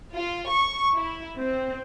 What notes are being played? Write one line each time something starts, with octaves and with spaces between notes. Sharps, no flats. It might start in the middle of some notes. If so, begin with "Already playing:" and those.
F4
C#6
E4
C4